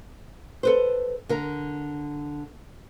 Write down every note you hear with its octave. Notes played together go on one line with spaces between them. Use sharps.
A4 B4 C5
D3 A#4